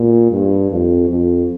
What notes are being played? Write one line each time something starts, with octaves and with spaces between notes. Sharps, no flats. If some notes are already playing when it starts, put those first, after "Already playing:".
Already playing: A#2
G2
F2
F2